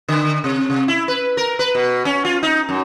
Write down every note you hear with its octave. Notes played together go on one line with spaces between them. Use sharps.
D3
C3
C3
E4
B4
A#4
B4
B2
C#4
F4
D#4
F#2